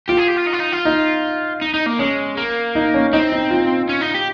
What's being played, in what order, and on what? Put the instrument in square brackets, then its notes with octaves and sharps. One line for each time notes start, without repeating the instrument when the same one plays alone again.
[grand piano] F4 [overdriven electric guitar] G4
[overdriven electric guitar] G#4
G4
F4
D#4
F4
D#4
F4
[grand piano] D#4
[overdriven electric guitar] D#4
D#4
A#3
[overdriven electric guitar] G#3 [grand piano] C#4
[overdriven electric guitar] A#3
[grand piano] D#4
C#4
[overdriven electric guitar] C4 [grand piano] D#4
[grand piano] D#4
F4
[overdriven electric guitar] C#4
D#4
G4